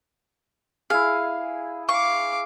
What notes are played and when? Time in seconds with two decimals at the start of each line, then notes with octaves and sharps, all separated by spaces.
0.90 E4 G#4 F5
1.89 F5 C#6 D6